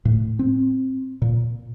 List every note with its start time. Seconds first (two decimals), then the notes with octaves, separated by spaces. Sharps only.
0.05 A2
0.39 C4
1.22 A#2